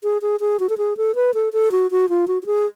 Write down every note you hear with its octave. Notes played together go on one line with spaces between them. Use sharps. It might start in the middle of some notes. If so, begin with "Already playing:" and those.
G#4
G#4
G#4
F#4
A4
G#4
A4
B4
A4
A4
F#4
F#4
F4
F#4
F#4
G#4